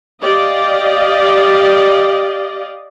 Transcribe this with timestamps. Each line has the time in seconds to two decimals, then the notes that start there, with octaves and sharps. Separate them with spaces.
0.22 G4 D5 D#5 F5